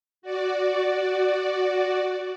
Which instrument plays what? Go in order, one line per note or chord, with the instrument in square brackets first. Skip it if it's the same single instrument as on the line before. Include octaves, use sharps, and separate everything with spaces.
[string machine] F#4 D5